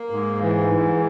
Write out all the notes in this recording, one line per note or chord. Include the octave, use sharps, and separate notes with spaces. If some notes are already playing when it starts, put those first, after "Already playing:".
Already playing: A#3
G#2
E3
G#2